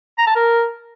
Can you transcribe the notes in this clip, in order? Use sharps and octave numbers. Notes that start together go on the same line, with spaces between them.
A#5
A5
A#4